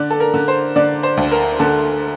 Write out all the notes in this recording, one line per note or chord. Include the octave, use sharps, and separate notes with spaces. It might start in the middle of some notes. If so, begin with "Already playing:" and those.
Already playing: D3 D5
A4
A#4
D3
C5
D3 D5
C5
D2
A#4
D3 A4